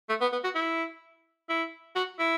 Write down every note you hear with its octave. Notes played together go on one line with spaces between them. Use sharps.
A3
B3
B3
F#4
E4
E4
F#4
E4